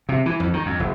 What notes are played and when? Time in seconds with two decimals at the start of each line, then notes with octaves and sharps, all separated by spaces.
0.09 C3
0.26 E3
0.40 F2
0.53 D#3
0.66 F2
0.80 F#1